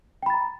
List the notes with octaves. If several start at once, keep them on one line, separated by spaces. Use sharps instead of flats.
G5 A#5 B5 A6